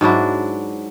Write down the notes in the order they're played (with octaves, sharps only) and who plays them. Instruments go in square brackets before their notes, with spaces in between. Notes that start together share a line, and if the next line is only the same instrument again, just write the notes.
[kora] G#2 F#3 D4 E4